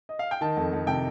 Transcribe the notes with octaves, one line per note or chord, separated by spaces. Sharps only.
D#5
F5
G5
D#3 A5
F2
F2
C3 G5